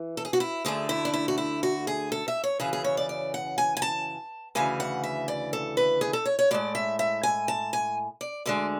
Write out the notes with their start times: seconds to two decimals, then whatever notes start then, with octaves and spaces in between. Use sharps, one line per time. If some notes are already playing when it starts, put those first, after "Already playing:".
Already playing: E3
0.17 A4
0.25 G#4
0.33 F#4
0.40 E4
0.65 D2 D3 A3 G#4
0.89 E4
1.05 D4
1.14 E4
1.28 F#4
1.38 E4
1.63 F#4
1.87 G#4
2.12 A4
2.28 E5
2.44 C#5
2.60 F#2 C#3 E3 G#4
2.73 G#4
2.84 C#5
2.97 D5
3.09 D5
3.34 F#5
3.58 G#5
3.77 G#5
3.82 A5
4.55 D2 C#3 E3 G#5
4.80 F#5
5.04 E5
5.28 D5
5.53 A4
5.77 B4
6.01 G#4
6.13 A4
6.26 C#5
6.39 C#5
6.51 A2 G#3 D5
6.75 E5
6.99 E5
7.23 G#5
7.48 A5
7.73 G#5
8.21 D5
8.46 D2 D3 G#3 D5